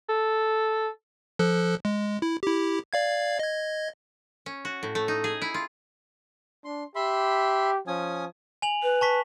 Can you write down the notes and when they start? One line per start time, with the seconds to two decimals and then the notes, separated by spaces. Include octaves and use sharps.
0.09 A4
1.39 F3 A4 F#6
1.85 G#3
2.22 E4
2.43 E4 G4
2.93 D5 F5 G#6
3.39 D#5 G#6
4.46 C#4
4.65 F#4
4.83 A2
4.95 A3
5.08 D#4
5.24 G#4
5.42 E4
5.54 F4
6.65 D4 C6
6.95 G4 E5 B5 C6
7.87 F3 C#4 G#5 D#6
8.62 G#5 F7 F#7
8.83 B4
9.01 A5 C#6 B6